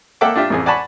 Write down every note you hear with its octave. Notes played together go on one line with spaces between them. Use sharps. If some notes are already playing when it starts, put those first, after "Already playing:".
A#3 A4 E5 F#5 G5 D6
D4 F4 G4 E5
A1 F2 G#4
D5 F#5 G#5 A5 B5 C#6